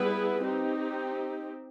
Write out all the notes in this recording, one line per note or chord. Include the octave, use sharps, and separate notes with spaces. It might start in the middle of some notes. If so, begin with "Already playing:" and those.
Already playing: G3 B3 E4 G#4 B4
C4 D#4 G4